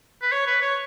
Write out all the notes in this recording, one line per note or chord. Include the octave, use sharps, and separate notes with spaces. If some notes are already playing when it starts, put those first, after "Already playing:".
B4
C#5
B4
C#5